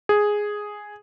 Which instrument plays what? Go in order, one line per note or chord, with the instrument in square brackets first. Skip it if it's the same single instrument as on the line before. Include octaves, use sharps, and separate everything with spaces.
[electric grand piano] G#4